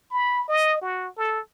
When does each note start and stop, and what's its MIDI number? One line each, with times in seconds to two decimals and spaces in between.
0.11 0.45 83
0.48 0.79 75
0.82 1.08 66
1.18 1.40 69